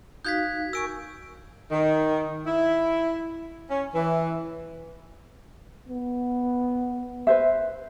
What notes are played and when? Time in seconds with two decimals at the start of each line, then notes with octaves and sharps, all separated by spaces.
0.25 D#4 F#4 F5 G6 G#6 B6
0.73 A#4 G#5 C#6 E6 D7
1.71 D#3
2.46 E4
3.69 C#4
3.94 E3
5.89 B3
7.27 B4 C5 E5